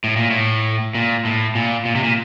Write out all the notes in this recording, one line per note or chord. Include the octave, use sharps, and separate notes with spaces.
A2
A#2
A2
A#2
A2
A#2
A#2
C3
A#2